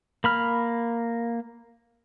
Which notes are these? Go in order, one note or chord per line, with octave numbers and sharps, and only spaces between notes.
A#3 B5 F6